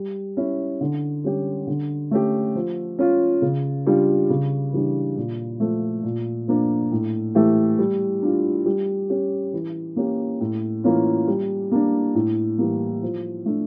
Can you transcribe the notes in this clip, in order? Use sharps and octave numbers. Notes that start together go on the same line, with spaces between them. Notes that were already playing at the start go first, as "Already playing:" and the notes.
Already playing: G3
C#4 E4
D3
G3 C#4 G4
D3
A3 C#4 G4
F3
C#4 F4
C#3
G3 D4 F4
C#3
E3 G3 D4
A#2
F3 A3
A#2
F3 A#3 D4
A2
E3 A3 E4 G4
G3
D4 F4
G3
C#4 G4
E3
A#3 C#4 G4
A2
E3 A#3 C#4 F4
G3
A#3 D4
A2
E3 G3 A#3
F3
A3 D4